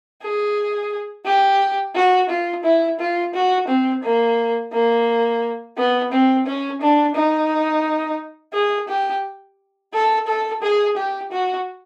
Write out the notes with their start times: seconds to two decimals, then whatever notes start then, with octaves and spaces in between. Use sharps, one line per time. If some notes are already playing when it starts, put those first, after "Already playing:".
0.22 G#4
1.25 G4
1.96 F#4
2.29 F4
2.64 E4
3.00 F4
3.34 F#4
3.68 C4
4.03 A#3
4.73 A#3
5.77 B3
6.12 C4
6.46 C#4
6.81 D4
7.15 D#4
8.54 G#4
8.88 G4
9.94 A4
10.27 A4
10.63 G#4
10.97 G4
11.31 F#4